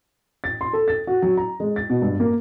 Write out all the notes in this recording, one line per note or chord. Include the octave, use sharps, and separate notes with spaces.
A6
C6
A4
A6
F#4
F#3
A#5
G#3
A6
B2
G2
A#3